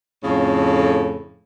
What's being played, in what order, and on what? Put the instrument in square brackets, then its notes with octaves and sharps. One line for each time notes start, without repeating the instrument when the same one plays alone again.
[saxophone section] F2 A2 C#3